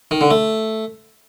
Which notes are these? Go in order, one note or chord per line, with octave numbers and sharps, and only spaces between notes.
D#3
D3
A3